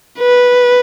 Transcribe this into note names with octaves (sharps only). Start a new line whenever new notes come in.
B4